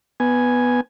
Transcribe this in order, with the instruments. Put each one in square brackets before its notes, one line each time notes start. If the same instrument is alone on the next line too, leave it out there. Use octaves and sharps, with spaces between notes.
[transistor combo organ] B3 G#5